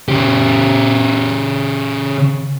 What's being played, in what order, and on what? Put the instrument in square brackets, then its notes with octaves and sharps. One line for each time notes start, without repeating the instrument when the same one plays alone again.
[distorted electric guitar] C#3 G4